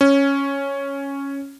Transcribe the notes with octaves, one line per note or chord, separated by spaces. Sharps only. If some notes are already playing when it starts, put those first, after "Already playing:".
C#4